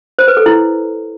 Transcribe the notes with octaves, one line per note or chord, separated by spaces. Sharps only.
C5
B4
A4
E4